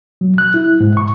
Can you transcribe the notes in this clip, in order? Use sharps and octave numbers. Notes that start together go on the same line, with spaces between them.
F#3
F#6
E4
G#2
C#6